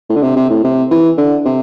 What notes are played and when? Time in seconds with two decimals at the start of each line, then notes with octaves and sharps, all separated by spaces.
0.09 A2
0.16 D3
0.22 C3
0.36 C3
0.50 A2
0.64 C3
0.91 E3
1.18 D3
1.45 C3